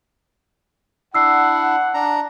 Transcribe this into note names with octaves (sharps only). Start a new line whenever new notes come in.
D4 E4 F#5 E6 C7
D4 A#5